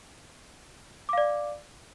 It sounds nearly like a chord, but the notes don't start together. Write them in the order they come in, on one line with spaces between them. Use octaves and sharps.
D6 F5 D5